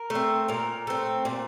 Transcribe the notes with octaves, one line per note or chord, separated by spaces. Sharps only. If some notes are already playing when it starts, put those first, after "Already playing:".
Already playing: A#4
A3
C4
A#2 A#4
A3 C4
A#2